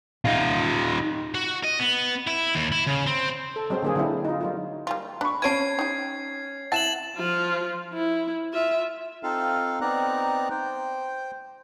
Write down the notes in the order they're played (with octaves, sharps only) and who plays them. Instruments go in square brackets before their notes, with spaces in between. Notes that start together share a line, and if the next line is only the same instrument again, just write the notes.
[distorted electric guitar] D#4 F4
F#4
D#5
B3
E4
D#2
E4
C#3
C4
[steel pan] A4
F#3 G#3 C4 C5
D3 A#3 G#4
D3 F#3 C4 D4 E4
D#4 F4
F#3 D#4 F4
[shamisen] G3 A#3 F4
[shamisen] D4 [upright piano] B5 C#6
[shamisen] F3 C5 A5 [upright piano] C#4 D7 D#7 [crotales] G#6 C7
[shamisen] D#4 G4
[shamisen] C4 F#5 A5 [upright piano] E4 [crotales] A6 E7 F#7
[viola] F3 F4
E4
F4 E5
[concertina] C4 D#4 F4 A4 F5
B3 C4 D#4 D5 A#5 F#6
C5 G5